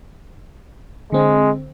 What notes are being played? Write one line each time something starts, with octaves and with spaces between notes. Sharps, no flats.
D3 G#3 C4